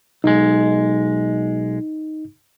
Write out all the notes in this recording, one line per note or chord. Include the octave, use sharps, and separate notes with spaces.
B1 G#3 D#4